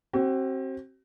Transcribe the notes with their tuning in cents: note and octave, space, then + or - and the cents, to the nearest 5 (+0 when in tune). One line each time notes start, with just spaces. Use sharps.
C4 +25 F#4 +45